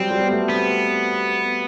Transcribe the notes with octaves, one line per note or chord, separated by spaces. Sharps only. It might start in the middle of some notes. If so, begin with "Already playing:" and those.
Already playing: F#3 G3 C4
G3
B3
A3
B3 C4